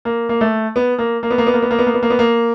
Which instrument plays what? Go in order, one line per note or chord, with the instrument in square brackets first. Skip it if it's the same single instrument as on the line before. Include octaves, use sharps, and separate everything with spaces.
[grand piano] A#3
A#3
A3
B3
A#3
A#3
B3
A#3
B3
A#3
B3
A#3
B3
A#3
B3
A#3
B3
A#3